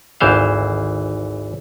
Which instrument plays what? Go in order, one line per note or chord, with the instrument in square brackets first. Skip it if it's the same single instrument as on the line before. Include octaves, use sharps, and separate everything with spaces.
[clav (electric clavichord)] G#1 D2 E3 C5 F5